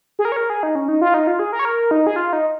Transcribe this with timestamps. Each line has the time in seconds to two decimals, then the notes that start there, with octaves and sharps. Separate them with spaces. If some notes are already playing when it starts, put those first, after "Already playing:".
0.19 G#4
0.25 A#4
0.32 C#5
0.37 A#4
0.50 G#4
0.63 D#4
0.75 C#4
0.88 D#4
1.01 F4
1.14 D#4
1.27 F4
1.39 G#4
1.53 A#4
1.59 C#5
1.65 A#4
1.91 D#4
2.07 G#4
2.16 F4
2.33 D#4